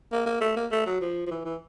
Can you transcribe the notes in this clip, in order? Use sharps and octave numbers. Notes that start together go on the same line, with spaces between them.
A#3
A#3
A3
A#3
A3
F#3
F3
F3
E3
E3